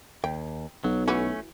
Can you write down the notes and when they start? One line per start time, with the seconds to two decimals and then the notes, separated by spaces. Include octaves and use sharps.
0.24 D#2 G5
0.84 B1 F#3
1.08 E3 A3 C#4 F#4 B4